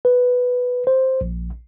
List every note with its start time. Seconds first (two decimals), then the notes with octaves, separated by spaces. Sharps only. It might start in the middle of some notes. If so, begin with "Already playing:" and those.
0.05 B4
0.87 C5
1.21 A#1